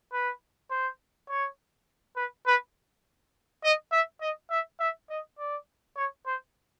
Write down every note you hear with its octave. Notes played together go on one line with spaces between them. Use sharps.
B4
C5
C#5
B4
B4
D#5
E5
D#5
E5
E5
D#5
D5
C#5
C5